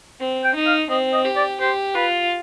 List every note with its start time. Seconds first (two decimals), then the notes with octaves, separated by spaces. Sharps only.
0.20 C4
0.44 G5
0.55 D#4
0.66 F5
0.90 C4 D#5
1.13 D#5
1.25 G4
1.36 D5
1.60 G4 C5
1.95 F4 B4